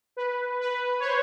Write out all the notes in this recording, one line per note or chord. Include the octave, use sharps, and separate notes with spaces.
B4
B4
C#5
C5